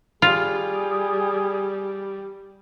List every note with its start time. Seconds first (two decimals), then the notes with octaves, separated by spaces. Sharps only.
0.22 G3 F4 G#4